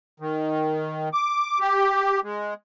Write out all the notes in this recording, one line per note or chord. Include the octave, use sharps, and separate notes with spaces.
D#3
D6
G4
G#3